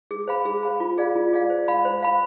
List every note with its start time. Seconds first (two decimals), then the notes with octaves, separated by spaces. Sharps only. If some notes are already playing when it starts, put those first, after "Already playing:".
0.11 G#4
0.28 C5 F5 B5
0.45 G#4
0.63 C5 F5 B5
0.80 F4
0.98 G#4 D5 F5
1.15 F4
1.33 G#4 D5 F5
1.50 C5
1.68 F5 B5
1.85 C5
2.03 F5 B5